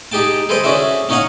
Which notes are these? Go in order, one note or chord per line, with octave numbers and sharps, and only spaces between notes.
D#4 G4 G#4 G5 A5
G#4 A4 B4 C5 D#5 G5
C#4 D4 F#4 G#4 E5
C#4 D#4 C#5 D#5 F5 F#5